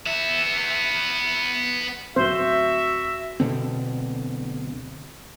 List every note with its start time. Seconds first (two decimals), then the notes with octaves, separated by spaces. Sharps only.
0.06 B3 E5
2.16 D1 C4 F#4 C5 E5
3.40 D1 B2 D3 C4